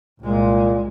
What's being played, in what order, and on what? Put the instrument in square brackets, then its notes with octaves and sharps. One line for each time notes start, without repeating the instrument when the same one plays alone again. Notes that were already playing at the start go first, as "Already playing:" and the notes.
[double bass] C2 G#3 [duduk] A#2